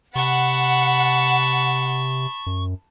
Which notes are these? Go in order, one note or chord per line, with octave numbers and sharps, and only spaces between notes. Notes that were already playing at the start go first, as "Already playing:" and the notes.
C3 F#5 A5 B5 C#6
F#2